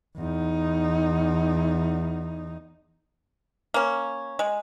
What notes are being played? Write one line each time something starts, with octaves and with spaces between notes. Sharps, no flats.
E2 D#4
A#3 C#4
G#3